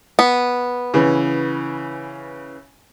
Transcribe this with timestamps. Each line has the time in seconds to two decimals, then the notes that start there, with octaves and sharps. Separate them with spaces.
0.19 B3
0.94 C#3 E3